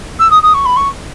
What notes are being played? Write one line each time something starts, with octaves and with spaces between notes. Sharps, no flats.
E6
D#6
D#6
C#6
B5
C#6